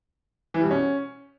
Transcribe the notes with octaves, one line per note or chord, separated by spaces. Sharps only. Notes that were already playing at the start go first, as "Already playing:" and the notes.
E3
G3
B2
C#4